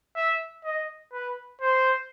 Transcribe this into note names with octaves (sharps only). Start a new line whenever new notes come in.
E5
D#5
B4
C5